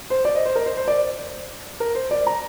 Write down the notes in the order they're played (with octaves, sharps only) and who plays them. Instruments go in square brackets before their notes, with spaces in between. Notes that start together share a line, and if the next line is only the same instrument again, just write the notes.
[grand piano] C5
D5
D#5
C5
A#4
C5
C5
D5
A#4
C5
D5
A#5